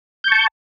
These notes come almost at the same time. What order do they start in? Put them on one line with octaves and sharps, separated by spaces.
G6 C#6 A5